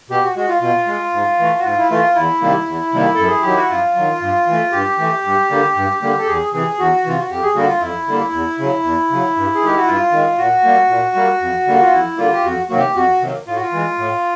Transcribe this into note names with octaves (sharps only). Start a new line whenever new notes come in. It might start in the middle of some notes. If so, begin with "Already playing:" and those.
B2 G4
F#4
G#3 F#4
F4
B2 F4
G#3
G#2
E3 A3
F#4
G#2 F4
E4
E3 A3 F4
E2 E4
C3 D#3 G3 A#3
E2
C3 D#3 G3 A#3
F#2 A4
G#4
D#3 F#3 G4
F#4
F#2 F4
D#3 F#3
G2
E3
A3
G2 G4
E3 A3
G2
D3 G3 A#3
G2
D3 G3 A#3
A4
E2 G#4
C3 E3 G#4
E2 F#4
C3 E3 F4
F#4
F2 G4
G#4
D3 G3 A#3 F#4
F4
F2 E4
D3 G3 A#3
E2
C#3 F#3
E2
C#3 F#3
G2
G#4
D#3 G#3 G4
F#4
G2 F4
D#3 G#3
A#2 F#4
G3 A#3
A#2
G3 A#3
F2
D3 G3 A#3
F4
F2 E4
D3 G3 A#3 F4
G4
F2 F#4
C3 D#3 F#3 A#3 F#4
G4
F2 F#4
C3 D#3 F#3 A#3
A2 F4
F#4
F4
E3 G#3
A2